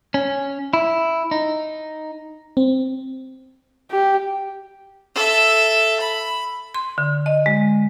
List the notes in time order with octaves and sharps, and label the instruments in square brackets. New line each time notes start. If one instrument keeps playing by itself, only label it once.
[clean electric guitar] C#4
E4
D#4
[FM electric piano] C4
[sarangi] G4
[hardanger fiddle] A4 E5
B5
[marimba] C6
D3
D#5
G#3